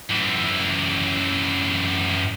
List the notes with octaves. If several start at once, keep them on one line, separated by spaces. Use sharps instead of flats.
F#2 E3